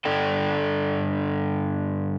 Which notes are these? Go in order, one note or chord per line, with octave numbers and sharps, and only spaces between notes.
G2 D3 A4 D5 G5